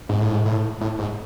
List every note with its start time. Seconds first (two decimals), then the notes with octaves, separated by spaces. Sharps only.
0.09 G#2
0.21 A2
0.32 G#2
0.45 A2
0.81 A2
0.99 G#2